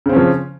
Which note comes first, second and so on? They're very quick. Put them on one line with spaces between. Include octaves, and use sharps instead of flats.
C#3 C4 C#4 F3